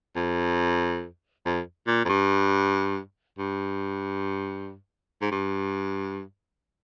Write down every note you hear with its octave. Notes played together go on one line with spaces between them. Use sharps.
F2
F2
A#2
F2
G2
G2
G#2
G2